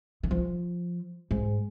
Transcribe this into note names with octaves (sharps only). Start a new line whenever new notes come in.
D#3
F3
G#2